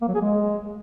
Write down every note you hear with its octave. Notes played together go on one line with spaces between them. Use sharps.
A#3
F#3
G#4
G#3